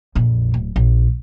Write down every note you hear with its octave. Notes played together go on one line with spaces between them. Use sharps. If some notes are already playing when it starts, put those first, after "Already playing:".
A#1 F2
D1
A#1